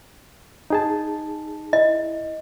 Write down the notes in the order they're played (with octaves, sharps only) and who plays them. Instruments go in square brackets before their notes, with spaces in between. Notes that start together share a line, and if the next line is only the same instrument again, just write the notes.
[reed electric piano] D#4 G#4 A5
[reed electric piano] E4 [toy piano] D#5